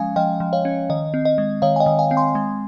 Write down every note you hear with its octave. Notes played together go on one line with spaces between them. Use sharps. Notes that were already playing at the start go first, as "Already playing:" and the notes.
Already playing: F3 G#3 C#4 F5 G#5
F3 D#5 G5
F3
C#5 F5
C#4
D#3 D#5
C4
D#5
G#3
D#3 C#5 F5
G#5
D#5 G5
D#3
F5 G#5
C4
G#5 C6
G#3